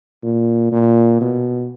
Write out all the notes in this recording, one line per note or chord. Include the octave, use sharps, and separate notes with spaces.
A#2
A#2
B2